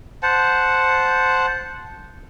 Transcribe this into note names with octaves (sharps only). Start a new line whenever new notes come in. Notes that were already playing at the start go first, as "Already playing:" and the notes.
C5 F#5 A5